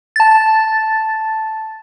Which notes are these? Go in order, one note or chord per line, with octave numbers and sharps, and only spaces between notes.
A5 A6